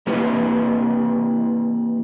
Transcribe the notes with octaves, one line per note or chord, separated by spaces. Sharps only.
E3 A#3 E4 G4 B4